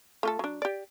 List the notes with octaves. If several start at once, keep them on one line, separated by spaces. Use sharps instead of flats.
A3 F4 A4
F#3 D4
G4 D5